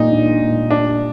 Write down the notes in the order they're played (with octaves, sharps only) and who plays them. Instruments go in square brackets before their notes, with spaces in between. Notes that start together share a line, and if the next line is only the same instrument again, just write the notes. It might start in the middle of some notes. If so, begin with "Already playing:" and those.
Already playing: [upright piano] A#2 G3 [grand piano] D#4
[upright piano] D4
A#2
[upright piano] G3 [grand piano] D4